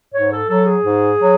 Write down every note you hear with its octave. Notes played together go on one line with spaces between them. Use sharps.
G#2 C#5
A4
F#3 A4
G#4
G#2
F#3